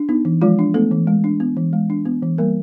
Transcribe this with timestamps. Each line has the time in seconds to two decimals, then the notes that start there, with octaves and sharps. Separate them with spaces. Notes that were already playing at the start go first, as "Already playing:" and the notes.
Already playing: D4
0.09 B3 D#4
0.25 E3
0.42 F3 G#3 F4
0.59 D4
0.74 A3 B3 A4
0.91 E3
1.07 G#3
1.24 D4
1.40 B3
1.57 E3
1.73 G#3
1.90 D4
2.05 B3
2.23 E3
2.38 G3 A#3 A#4